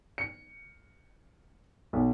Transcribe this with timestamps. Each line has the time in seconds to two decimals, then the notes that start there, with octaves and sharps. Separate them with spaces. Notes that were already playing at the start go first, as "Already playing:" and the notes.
0.18 C#7
1.93 B1